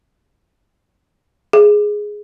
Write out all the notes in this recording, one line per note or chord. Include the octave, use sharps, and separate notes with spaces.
G#4